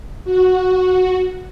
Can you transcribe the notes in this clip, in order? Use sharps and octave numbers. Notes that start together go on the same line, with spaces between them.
F#4